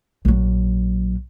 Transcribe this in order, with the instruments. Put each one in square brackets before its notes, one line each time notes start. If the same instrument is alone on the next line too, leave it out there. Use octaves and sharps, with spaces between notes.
[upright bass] A#1 F#3